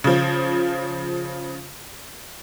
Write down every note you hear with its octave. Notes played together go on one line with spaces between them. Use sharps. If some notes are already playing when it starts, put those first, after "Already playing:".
C#3 F3